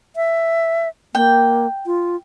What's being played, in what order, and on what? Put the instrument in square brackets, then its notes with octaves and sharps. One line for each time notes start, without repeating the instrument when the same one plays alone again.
[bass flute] E5
[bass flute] A#3 [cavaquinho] G5
[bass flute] F4